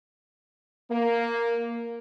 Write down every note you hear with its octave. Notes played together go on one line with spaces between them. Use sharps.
A#3